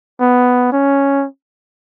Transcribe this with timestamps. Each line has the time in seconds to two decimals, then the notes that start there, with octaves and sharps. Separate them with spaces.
0.21 B3
0.72 C#4